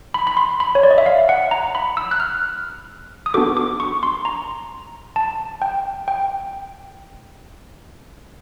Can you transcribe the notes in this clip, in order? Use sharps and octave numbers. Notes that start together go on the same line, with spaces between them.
B5
B5
C6
B5
C#5
D5
D#5
E5
F5
F#5
A#5
B5
E6
F#6
F6
D#6
B3 D4 F#4 A4 D6
D6
C#6
C6
A#5
A5
G5
G5